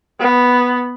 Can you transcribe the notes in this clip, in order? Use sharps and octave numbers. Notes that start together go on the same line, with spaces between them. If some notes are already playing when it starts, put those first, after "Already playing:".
B3